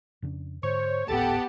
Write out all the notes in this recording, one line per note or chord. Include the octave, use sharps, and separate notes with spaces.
F2 C#3 D4
G#2 D3 C5 C#5
D1 G#1 A2 B3 G4 A4 F#5 A5